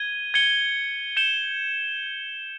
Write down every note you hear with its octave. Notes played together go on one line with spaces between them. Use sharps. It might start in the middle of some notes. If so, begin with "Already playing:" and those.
Already playing: G#6 D#7 G7
G#6 C#7 G7
G6 C#7 E7 G7